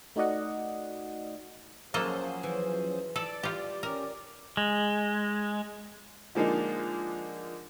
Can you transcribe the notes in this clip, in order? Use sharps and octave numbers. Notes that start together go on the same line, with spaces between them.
A3 D#4 F#4 D5 D#5 F#5
F3 F#3 A#3 C#4 G#4 A4 C5 D#5
E3
A4 D5
G3 F4 G4
C#4 G4 A#4
G#3
D3 F3 G#3 A#3 D4 D#4